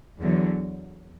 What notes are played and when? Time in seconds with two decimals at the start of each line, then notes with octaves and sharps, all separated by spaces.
0.20 E2 D3 F#3